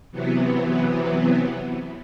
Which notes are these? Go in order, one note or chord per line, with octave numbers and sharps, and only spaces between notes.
C3 E3 F#3 B3